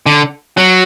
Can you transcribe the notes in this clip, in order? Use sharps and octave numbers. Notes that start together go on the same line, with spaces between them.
D3
F#3